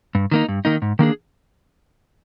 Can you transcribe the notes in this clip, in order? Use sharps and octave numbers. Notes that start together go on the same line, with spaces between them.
G2
D#3 A#3 D#4
G2
D#3 A#3 D#4
G#2
D#3 A#3 D4 G#4